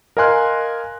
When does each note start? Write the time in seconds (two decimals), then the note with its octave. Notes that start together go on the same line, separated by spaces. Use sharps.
0.17 A#4 D#5 F5 G#5 C6 F#6